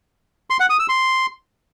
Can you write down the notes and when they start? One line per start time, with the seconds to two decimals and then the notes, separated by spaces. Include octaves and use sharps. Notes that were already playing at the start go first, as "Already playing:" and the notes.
0.50 C6
0.60 F#5
0.70 D#6
0.79 E6
0.89 C6